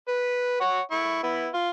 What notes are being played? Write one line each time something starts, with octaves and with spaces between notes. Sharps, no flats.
B4
C#5 F#5
E4 C#6
B3 E4
F4